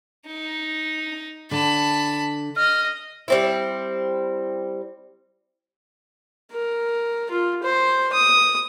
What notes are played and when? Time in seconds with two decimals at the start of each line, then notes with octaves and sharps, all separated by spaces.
0.27 D#4
1.51 D3 A5 B5
2.56 D#5 F6
3.28 G3 C4 E4
6.52 A#4
7.31 F4
7.63 C5
8.13 D#6